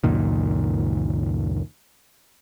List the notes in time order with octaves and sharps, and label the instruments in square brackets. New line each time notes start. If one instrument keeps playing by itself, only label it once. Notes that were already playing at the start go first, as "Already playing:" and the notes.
[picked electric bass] C#2 F#2 A#2 D#3